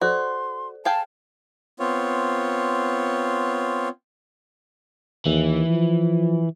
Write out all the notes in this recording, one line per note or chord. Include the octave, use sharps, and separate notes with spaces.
F#4 A4 C5 D5 C6
G#4 F5 G5 A5
B3 C4 F4 C#5
D#2 E3
F3